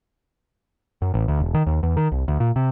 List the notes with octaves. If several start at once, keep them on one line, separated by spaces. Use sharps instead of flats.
F#2
A1
D2
E1
D#3
D#2
E2
D#3
C2
D2
A#2
C3